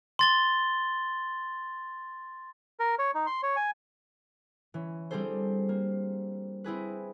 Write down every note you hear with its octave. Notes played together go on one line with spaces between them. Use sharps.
C6 A6 G7
A#4
C#5
D#4
C6
C#5
G#5
E3 C#4
G3 C4 D4 G#4 A4 C5
A#3
C4 E4 G#4 B4